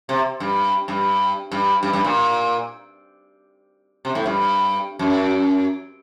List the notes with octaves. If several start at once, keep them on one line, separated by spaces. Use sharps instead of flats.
C3
G2
G2
G2
G2
G2
A#2
C3
A2
G2
F#2